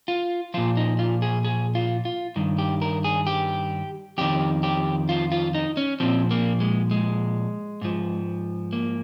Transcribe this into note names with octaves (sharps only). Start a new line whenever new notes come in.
F4
A#2 F3 F4
D#4
F4
G#4
G#4
F4
F4
G2 D#3
G4
A#4
G#4
G4
F2 D#3 G4
G4
F4
F4
D#4
C#4
A#2 F3 C4
A#3
G#3
G#3
G#2 F3
A#3